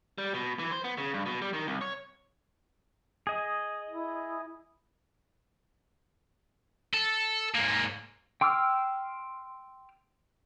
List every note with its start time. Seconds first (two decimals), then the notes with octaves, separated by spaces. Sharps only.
0.18 G3
0.34 B2
0.59 E3
0.71 C5
0.84 B3
0.98 C#3
1.14 G2
1.26 B2
1.42 G3
1.54 D#3
1.67 C2
1.81 C#5
3.27 G#4 D#5
3.90 E4
6.94 A4
7.55 G#2 A#3
8.41 G5 C6 D6 E6 F6